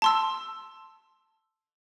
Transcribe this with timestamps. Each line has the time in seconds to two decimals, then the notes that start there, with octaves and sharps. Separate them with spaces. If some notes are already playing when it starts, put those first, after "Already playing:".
0.02 A5 C6 E6